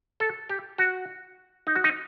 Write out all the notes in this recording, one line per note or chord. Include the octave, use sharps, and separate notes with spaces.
A4
G4
F#4
D#4
F#4
D#4